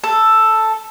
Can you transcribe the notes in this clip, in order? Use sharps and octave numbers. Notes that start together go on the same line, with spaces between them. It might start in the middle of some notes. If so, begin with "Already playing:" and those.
A4